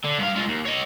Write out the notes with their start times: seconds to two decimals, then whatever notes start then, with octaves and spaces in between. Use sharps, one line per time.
0.04 D3
0.18 G2 F5
0.35 G#3 F4
0.48 D#2
0.65 C#5 D#5